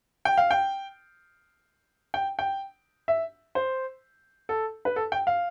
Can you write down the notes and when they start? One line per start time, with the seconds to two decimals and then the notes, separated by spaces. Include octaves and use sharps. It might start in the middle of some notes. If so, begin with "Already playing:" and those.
0.25 G5
0.38 F5
0.51 G5
2.14 G5
2.39 G5
3.08 E5
3.55 C5
4.49 A4
4.85 B4
4.96 A4
5.12 G5
5.27 F5